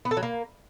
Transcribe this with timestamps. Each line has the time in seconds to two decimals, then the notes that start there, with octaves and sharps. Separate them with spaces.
0.05 B3
0.11 A4
0.17 F#3
0.23 A#3